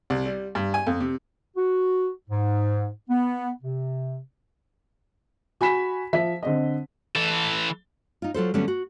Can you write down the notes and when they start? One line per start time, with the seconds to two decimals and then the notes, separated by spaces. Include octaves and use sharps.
0.10 C2
0.26 G3
0.55 G2
0.74 G#5
0.87 F2
1.00 C3
1.57 F#4
2.30 G#2
3.10 B3
3.62 C3
5.61 F#4 G#5 B5 B6 E7
6.13 F3 E5 B6
6.43 D3 C4 D#5
7.16 E3 A4
8.22 D#4 F4
8.34 F#3 F4 A4 C5
8.54 D3 F#3 G3 A3 B3 C#4
8.68 F#4